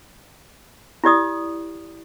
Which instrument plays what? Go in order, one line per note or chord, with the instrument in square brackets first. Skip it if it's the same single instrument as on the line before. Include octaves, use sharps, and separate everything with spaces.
[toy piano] E4 G4 D5 D#6